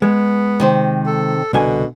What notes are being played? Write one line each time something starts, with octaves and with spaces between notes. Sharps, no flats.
G#3 B3
C3 D#3 C5
A4
C2 B2 D3 G#5